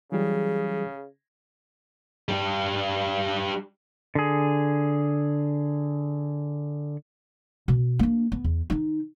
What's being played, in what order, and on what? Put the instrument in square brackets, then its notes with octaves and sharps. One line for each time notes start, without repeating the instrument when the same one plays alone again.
[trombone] C#3 [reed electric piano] E3 F#3 G3 [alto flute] G#4
[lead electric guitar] G3 D4
[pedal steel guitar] D3 G#4
[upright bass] B2
A#3 D4
B3
E2
D#3 D#4